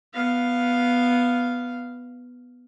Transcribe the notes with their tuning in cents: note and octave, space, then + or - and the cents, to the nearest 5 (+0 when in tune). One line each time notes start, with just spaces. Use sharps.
B3 +0 F5 +0